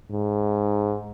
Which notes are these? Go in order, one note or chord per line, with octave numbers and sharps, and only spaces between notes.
G#2